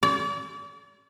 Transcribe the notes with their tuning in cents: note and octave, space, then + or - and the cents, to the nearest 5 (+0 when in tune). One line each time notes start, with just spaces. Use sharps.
D5 -40